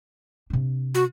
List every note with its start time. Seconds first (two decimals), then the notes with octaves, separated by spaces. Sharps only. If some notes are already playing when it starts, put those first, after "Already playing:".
0.50 C3 D4
0.95 F#4